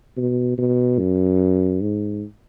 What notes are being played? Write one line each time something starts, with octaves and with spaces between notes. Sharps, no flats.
B2
B2
F#2
G#2